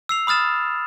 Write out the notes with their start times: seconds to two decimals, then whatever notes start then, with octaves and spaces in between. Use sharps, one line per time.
0.09 E6 C7 F7
0.27 B5 D#6 F6 A6 E7